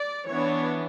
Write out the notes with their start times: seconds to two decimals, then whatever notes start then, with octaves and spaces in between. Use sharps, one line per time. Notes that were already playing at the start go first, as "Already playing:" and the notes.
Already playing: D5
0.27 E3 B3 D4 C#5